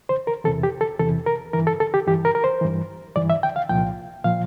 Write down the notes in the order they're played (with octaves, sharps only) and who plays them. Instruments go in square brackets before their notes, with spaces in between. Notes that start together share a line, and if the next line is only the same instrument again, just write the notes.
[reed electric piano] C5
A#4
E2 C3 E3 A4
G4
A4
E2 C3 E3 A4
A#4
G2 E3 A#4
A4
A4
G4
G2 E3 G4
A#4
A#4
C5
G2 E3
G2 E3 D5
E5
G5
F5
C2 A#2 F3 G5
A#2 F3 F5